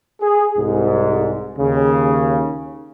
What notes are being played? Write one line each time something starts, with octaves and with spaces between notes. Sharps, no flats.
G#4
C2 G#2
D#2 C#3